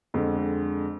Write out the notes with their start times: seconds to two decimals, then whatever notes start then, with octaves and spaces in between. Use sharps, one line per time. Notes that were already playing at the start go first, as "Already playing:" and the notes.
0.14 F2 D3 G#3